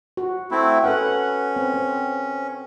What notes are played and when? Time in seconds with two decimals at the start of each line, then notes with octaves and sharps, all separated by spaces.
0.17 F#4
0.51 A3 C4 E4
0.84 C#4 A4 B4 F#5
1.56 C4
1.74 C4